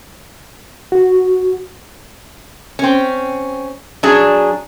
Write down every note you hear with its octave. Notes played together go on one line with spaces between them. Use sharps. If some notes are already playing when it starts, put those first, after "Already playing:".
F#4
C4 C#4
F#3 D4 G#4